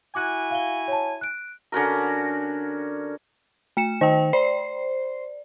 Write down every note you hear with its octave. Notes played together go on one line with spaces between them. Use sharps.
E4 F#4 G#5 D6 F#6
F5 G7
C#5 A5
F#6 D7
D3 C#4 F#4 A#4
A3 C#7 E7
D#3 C5 G5
C5 D5